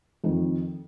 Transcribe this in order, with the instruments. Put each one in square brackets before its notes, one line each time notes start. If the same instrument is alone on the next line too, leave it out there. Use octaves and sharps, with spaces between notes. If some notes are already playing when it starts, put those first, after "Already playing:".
[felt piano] F2 D#3